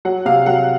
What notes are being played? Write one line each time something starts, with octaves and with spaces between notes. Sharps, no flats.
F#3 F#5
C3 F5
F#3 F#5